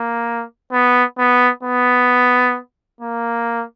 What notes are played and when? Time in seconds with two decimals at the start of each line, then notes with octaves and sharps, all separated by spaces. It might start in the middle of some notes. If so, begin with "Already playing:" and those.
Already playing: A#3
0.72 B3
1.18 B3
1.63 B3
3.01 A#3